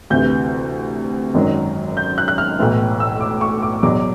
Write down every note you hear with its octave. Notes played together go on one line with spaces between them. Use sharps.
D2 C3 E3 G6
G#1 F#2 D#3 F#3
G6
F#6
F#6
F6
B1 A2 E3
E6
D6
C#6
D6
E2 B2 F#3 D6